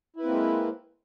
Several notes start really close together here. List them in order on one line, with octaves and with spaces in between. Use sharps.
E4 B4 C4 A#3 G#3